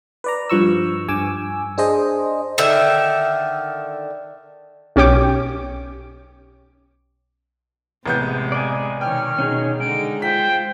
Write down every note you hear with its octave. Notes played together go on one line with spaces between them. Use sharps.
B4 D5 A#5
G2 F3 C#6 E6
G2 G#5 D6 E6
D4 G#4 C5 D#5
D3 D#3 E5
B1 C#4 G4 C#5 G5 D6
A1 C3 G#3 B3 G6
D5 D#5 G#5
B2 D#3 C#5 G5 F6
B2 C#4 D#4 G#4
D3 G#3 D#4 D7
F4 C5 G5 B6